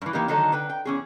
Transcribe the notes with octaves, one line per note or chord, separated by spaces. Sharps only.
G2 E3
E3 A#3 D#4 G4
D3 D#3 F#3 D#4 A4
D3 B4 G5
G5
E2 C#4 G#4